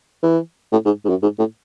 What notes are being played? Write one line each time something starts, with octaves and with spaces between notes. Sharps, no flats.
E3
A2
G#2
G#2
F#2
G#2
A2